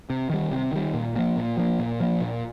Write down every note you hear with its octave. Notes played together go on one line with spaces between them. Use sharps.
C3
D#3 G3
C3
D#3 G3
A#2
F3 A#3
A#2
F3 A#3
A#2
F3 A#3
A#2